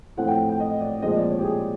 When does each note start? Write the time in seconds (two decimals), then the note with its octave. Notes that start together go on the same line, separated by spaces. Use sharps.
0.17 A2 F3 A3 C4 F#5
0.28 G5
0.49 G5
0.60 D#5
0.81 D5
1.02 A#2 F3 G#3 C4 D#5
1.16 D5
1.30 C#5
1.39 G4
1.44 G#4